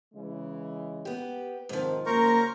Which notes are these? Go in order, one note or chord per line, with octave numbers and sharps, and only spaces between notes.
C#3 E3 G#3
B3 G4
G#2 C3 D#3 F3
C#3 F#3 A#3 A#4 C5 A#5 C#6